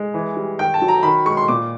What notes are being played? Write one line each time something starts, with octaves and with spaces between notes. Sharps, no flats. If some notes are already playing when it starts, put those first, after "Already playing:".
Already playing: G#3
E3
G3
D#3 G5
A5
F#3
A#5
D#3 B5
G#3 C#6
C6
A#2 D6